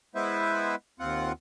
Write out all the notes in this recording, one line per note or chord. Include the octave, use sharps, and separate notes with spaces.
G#3 B3 E4 B4 C5 E5
D#2 C4 F4 F#5